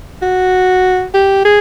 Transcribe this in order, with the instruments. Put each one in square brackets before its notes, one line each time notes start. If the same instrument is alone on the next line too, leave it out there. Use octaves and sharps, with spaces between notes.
[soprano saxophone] F#4
G4
G#4